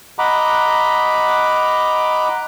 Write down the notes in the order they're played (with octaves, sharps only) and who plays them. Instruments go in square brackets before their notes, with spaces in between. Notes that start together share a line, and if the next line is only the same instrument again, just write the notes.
[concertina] D#5 F#5 A#5 B5 D6